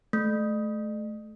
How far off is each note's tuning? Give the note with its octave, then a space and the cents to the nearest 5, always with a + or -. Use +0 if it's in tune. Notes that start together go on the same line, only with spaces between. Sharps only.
A3 -25